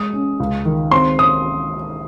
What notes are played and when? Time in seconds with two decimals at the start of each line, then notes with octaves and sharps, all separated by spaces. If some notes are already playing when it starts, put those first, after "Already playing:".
Already playing: G#3 D#6
0.13 C#4
0.40 C#2
0.65 D#3
0.91 C4 C6
1.19 D#6